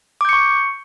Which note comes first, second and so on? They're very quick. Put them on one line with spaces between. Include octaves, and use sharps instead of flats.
D6 G6 C#7 C#6